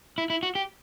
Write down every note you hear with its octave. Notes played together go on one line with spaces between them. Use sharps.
E4
E4
F#4
G4